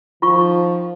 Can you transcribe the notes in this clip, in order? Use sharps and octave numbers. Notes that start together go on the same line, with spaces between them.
D#3 F3 F4 C#6